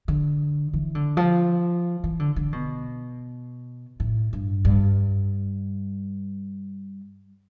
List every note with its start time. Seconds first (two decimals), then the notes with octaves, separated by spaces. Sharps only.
0.08 D3
0.73 E3
0.95 D3
1.17 F3
2.04 E3
2.19 D3
2.36 D3
2.52 B2
4.00 A2
4.33 G2
4.65 G2